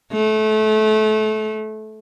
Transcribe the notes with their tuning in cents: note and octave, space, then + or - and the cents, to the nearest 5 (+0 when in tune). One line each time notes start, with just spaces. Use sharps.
A3 -25